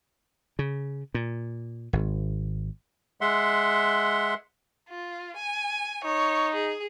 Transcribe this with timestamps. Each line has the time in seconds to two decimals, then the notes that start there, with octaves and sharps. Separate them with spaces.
0.59 C#3
1.14 A#2
1.93 G#1
3.21 G#3 E5 F#5 C6
4.89 F4
5.37 G#5
6.04 D#4 C#5
6.55 G#4